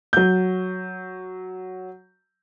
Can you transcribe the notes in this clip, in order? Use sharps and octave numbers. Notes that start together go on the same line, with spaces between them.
F#3 G6